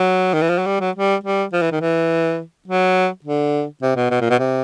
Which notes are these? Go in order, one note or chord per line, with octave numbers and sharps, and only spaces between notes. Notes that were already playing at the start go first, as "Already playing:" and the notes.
Already playing: F#3
D#3
E3
F3
F#3
G3
F#3
G3
G3
F3
E3
D#3
E3
F#3
D3
C3
B2
B2
A#2
B2
C3